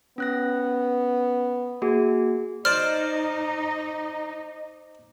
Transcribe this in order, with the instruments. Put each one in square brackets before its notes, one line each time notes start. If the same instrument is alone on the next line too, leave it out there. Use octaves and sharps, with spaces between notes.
[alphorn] B3 [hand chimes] C#4 F#6 A#6
[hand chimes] A#3 F#4 G#4
[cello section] D#4 [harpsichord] C5 D5 A5 [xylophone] F6